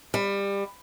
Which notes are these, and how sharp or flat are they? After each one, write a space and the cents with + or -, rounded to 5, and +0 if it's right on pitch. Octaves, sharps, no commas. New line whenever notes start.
G3 +25